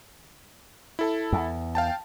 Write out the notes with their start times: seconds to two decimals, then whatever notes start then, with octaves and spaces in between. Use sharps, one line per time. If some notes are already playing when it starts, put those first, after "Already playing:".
0.99 E4 A4 A5
1.32 E2
1.75 F5 G5 A5